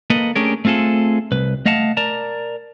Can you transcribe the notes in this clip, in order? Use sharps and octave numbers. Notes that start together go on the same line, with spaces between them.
A#3 A4 B4 D#5
A3 C#4 D4 G4 G#4 A#4
A3 C4 F4 G#4 A4
C2 B4
A3 D#5 F5 F#5 A5
A#4 D5 A5 A#5